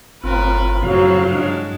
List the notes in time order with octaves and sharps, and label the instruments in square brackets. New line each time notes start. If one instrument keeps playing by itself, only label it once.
[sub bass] G1 [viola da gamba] A2 A#4 B4 [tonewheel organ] C4 F4
[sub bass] F#2 [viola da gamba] A2 C4 [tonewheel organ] C#3 F3 F5 [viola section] F#3
[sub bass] G2 [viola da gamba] G#3 D4 F#4